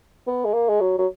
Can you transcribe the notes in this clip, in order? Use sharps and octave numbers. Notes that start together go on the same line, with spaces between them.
B3
G#3
A#3
G#3
F#3
F#3